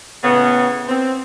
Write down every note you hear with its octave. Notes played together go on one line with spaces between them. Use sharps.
A2 C#3 B3
C4